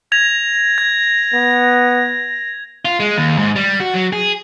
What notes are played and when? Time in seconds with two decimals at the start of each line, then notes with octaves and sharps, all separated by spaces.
0.12 G#6 A#6 F7
0.78 G#6
1.34 B3
2.85 F4
3.00 G#3
3.18 D#2
3.38 G#2
3.56 G3
3.80 F#4
3.94 F#3
4.13 G#4